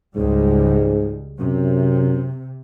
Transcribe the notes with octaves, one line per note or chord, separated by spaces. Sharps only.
C#2 G#2 G3 G#3
F#2 C3